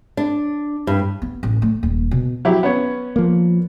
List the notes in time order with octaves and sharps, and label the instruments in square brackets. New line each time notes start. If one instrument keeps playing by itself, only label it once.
[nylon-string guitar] D4
G2
[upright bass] B3
A1
A3
D#1
B2
[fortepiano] F#3 E4 G4
B3 C#4 C#5
[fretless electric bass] F3 A#3